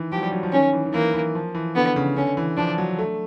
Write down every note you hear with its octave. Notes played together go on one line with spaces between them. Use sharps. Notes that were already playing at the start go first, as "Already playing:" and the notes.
Already playing: D#3 E3
F3 G4
F#3
G3
F#3
F3
D#3 C#4
E3
D#3
E3 A#3
E3
F3
E3
D3 B3
C#3
D3 C#4
E3
F3 D4
F#3
A3